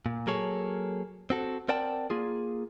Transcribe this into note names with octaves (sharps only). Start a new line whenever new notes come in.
A#2
F#3 A#3 G#4 A4 C#5
C4 F#4 A4
C4 A#4 D5 F#5 G5 A5
A#3 F4 G#4